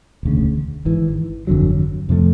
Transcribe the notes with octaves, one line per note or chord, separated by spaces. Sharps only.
E1 D2 C#3
G#1 G#2 E3
G1 F2 D3 F#3
F2 C3 F3 A3